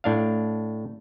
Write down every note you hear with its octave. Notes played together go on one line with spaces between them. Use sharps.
A2 D4 F5